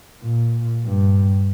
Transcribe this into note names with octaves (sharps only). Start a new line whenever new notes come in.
A#2
G2